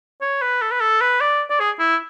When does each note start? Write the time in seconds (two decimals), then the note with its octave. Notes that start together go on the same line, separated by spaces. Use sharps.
0.21 C#5
0.42 B4
0.61 A4
0.72 B4
0.81 A4
1.01 B4
1.21 D5
1.50 D5
1.60 G#4
1.79 E4